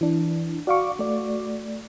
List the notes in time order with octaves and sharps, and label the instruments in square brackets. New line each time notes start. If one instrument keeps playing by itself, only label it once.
[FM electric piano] E3 D4 [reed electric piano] E4
[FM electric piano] F#4 D6 [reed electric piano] D5 F5 C#6
[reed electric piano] A3 D5